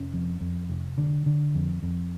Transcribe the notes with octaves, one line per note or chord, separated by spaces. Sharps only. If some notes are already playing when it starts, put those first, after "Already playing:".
Already playing: F1 C#4
F2
F2
F1
D3
D3
F2
F2